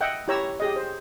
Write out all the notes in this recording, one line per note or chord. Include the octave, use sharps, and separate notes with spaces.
D#5 E5 F#5 G5
E4 G4 C#5 A#5 E6
G4 G#4 D#5
C5